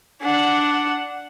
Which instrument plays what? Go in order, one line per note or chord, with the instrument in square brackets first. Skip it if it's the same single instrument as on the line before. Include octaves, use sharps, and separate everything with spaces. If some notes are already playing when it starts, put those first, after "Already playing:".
[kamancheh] D4 F#5